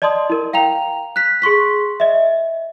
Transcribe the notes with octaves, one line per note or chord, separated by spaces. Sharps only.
D5 D#5 A5 C6 D#6
E4 A#4
F5 G5 A#5 F7
F#6 B6
G#4 C6 C#6 B6
D#5 E5